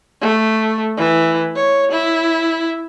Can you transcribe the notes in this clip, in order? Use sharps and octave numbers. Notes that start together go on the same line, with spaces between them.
A3
E3
C#5
E4